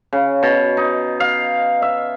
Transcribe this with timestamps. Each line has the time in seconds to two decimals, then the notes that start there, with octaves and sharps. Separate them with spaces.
0.13 C#3
0.43 B2
0.77 D#4
1.20 F5
1.82 E5